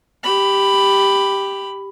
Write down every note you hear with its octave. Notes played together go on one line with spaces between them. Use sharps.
G4 B5